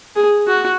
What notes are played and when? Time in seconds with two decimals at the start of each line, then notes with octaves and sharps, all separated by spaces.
0.16 G#4
0.47 F#4